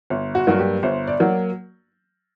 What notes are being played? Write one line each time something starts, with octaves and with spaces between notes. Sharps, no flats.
G1
F#4
G2 F#3 A#3 F#4
G4
G1 C5
D5
F#3 A#3